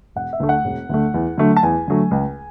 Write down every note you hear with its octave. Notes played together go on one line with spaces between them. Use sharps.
E1 F#5
E5
D2 D3 A3
F#5
E1
D2 D3 A3
E2
D3 F#3 A3
A5
E2 G#5
D3 F#3 A3
C#2